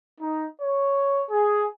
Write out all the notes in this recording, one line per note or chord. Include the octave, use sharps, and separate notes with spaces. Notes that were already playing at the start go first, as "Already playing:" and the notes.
D#4
C#5
G#4